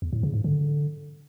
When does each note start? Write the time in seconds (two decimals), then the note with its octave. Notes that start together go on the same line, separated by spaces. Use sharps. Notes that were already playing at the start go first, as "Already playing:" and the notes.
0.02 E2
0.13 A2
0.23 C#3
0.34 G#2
0.44 D3